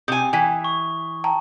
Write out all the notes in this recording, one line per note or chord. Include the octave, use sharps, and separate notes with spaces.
C3 G#5 D#6 G6
E3 G5 G#5 B6
C#6
G5 A5 A#5